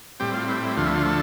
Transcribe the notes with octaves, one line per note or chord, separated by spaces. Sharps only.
A2 G3 C4 G4
F4
E4
E4
D2 D3 F3 A3 F4
E4
F4
A4